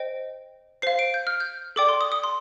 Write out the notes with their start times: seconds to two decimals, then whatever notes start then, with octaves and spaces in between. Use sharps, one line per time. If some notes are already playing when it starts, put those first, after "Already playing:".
Already playing: C5 D#5 G5
0.82 C5 F5 C7
0.99 D7
1.14 G6
1.27 F6
1.40 G6
1.76 A4 D5 G5 D6
1.89 C6
2.01 D#6
2.12 D#6
2.24 C6